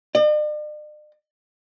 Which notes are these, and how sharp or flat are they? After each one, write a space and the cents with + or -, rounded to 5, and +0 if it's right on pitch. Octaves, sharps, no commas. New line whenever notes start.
D5 +45